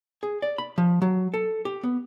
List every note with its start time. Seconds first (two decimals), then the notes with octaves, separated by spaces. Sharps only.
0.23 G#4
0.42 D5
0.58 B5
0.78 F3
1.02 F#3
1.34 A4
1.65 G4
1.83 B3